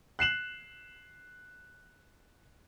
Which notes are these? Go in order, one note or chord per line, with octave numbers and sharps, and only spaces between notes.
F#6 C7 E7 F#7